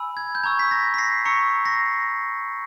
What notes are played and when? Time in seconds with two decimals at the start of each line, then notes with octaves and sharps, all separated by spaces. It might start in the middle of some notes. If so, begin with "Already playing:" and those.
Already playing: G#5 B5 E6
0.17 G#6
0.35 G6
0.43 A#5 C#6 E6 G#6
0.59 B6
0.71 G#6 A#6
0.94 B6
0.98 A#6 C7
1.25 A#5 C#6 E6 B6 C#7
1.65 A#6 C7